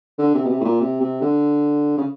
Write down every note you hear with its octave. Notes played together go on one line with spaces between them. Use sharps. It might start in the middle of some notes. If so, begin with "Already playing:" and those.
D3
C3
B2
C3
A2
A#2
C3
C3
D3
C#3